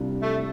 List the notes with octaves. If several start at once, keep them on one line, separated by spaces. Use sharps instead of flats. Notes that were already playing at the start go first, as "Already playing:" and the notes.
Already playing: C2 C3 G3 D4 F4
A3